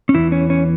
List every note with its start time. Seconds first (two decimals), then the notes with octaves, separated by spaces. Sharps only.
0.09 C#4
0.14 E2 C#3 E3 E4
0.32 C#4
0.50 C#4